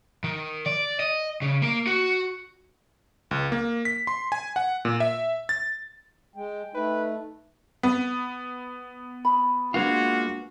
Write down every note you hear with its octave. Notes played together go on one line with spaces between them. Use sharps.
D#3
D5
D#5
C#3
A#3
F#4
C#2
A#3
B6
C6
G#5
F#5
A#2
E5
A6
G#3 G5
A3 D#4 B4
B3
B5
G#3 A#3 D4 F4 F#4 B4 G#5